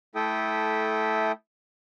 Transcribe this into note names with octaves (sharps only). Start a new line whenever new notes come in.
A3 E4 A4 E5 G5 D#6